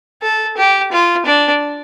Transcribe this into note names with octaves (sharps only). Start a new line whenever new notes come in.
A4
G4
F4
D4